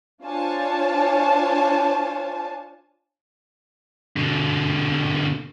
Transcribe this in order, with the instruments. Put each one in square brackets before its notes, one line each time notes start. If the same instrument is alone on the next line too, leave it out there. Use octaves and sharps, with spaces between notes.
[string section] D4 F4 C5 C#5 G#5 A5
[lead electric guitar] B2 D3